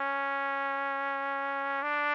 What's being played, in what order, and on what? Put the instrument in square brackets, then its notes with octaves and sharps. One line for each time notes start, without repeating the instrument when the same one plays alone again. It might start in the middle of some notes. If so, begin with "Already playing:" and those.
Already playing: [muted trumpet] C#4
D4